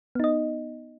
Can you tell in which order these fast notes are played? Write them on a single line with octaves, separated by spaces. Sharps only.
B3 D#4 D#5